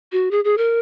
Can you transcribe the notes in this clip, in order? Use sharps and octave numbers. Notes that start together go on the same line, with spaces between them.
F#4
G#4
G#4
A#4